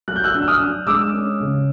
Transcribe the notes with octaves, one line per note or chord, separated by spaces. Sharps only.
F#3 F#6
G6
E6 F#6
D4
E6
D#6 F6
D4
G#3 D6 E6
C#4
C#3